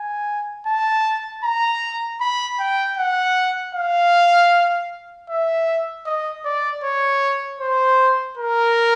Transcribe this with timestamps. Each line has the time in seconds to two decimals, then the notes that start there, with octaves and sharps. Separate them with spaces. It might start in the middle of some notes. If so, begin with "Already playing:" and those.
Already playing: G#5
0.66 A5
1.44 A#5
2.21 B5
2.59 G5
2.97 F#5
3.75 F5
5.30 E5
6.06 D#5
6.45 D5
6.83 C#5
7.60 C5
8.37 A#4